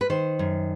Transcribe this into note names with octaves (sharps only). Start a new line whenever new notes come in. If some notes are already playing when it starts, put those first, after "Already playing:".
B4
D#3 C5
F#2